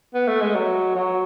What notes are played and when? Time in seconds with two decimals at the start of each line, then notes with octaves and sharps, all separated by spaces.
0.15 B3
0.28 A3
0.41 G#3
0.55 F#3
0.95 F#3